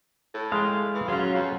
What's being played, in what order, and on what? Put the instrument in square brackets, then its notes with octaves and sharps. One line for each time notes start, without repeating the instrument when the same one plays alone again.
[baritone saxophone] A2
[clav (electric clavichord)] G#3 E5 G5 [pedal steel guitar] F5
[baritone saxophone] E3
[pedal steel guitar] F#3 [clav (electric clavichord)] C#4 G#4 [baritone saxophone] F4
[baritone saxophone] F2